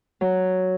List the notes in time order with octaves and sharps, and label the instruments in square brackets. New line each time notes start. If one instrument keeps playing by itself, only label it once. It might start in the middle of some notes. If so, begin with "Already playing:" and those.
[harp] F#3